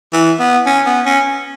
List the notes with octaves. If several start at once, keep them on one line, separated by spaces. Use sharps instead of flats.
E3
B3
C#4
B3
C#4